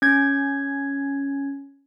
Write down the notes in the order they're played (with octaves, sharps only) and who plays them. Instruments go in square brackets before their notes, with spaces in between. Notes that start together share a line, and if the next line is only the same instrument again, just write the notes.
[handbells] C#4 G#6